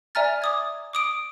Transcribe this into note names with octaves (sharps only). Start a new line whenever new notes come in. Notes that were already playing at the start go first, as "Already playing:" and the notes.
D5 E5 G#5 A#5 F6 A6
D6 D#6 G#6
D6 D#6 D7